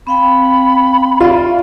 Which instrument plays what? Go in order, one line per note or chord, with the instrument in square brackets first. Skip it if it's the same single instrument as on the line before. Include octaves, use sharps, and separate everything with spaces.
[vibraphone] C4 F5 G5 [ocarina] B5
[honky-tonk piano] F4 [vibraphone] D5 E5 C#6